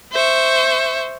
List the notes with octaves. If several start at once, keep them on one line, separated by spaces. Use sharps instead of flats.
C5 E5 C#6